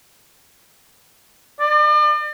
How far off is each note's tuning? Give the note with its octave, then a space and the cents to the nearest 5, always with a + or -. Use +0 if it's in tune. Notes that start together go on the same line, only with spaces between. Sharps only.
D5 +40